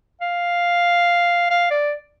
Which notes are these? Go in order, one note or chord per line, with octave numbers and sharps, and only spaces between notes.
F5
F5
D5